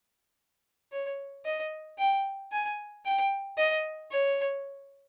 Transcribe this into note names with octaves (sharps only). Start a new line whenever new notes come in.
C#5
D#5
G5
G#5
G5
D#5
C#5